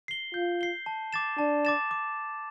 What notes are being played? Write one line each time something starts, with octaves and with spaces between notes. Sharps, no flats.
C7 G7
F4 G6
C7 G7
A5
D6 A6 E7
D4 A5
D6 A6 E7
D6